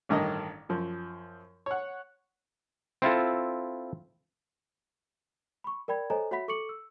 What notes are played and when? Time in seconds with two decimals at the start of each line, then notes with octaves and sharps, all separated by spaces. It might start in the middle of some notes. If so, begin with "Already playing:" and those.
0.09 A1 G2 D#3 D#5
0.69 F#2 F3
1.66 C#5 F#5
3.02 C4 E4 F4 A4
5.64 B5 C#6
5.88 A#4 D5 G5 B5 G#6
6.10 A4 C5 C#5 D#5 G#5 A#5
6.31 F#4 C#5 E5 F#5 B5 B6
6.48 A4 C#6 D6 C#7 F#7
6.69 E6